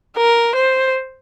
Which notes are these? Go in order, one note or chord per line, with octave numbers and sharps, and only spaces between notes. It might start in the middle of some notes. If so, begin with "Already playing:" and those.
A#4
C5